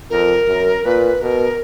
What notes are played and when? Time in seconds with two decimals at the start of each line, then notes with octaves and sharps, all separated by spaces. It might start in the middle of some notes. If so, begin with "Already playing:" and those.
0.10 F2 A#4
0.47 F#2
0.84 A#2 B4
1.21 B2 A#4